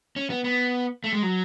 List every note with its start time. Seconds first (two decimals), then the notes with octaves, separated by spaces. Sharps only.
0.16 C#4
0.30 B3
0.44 B3
1.04 A3
1.13 G#3
1.23 F#3